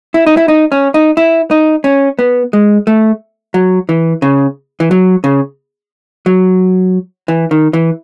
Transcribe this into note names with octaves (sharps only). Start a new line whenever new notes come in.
E4
D#4
E4
D#4
C#4
D#4
E4
D#4
C#4
B3
G#3
A3
F#3
E3
C#3
E3
F#3
C#3
F#3
E3
D#3
E3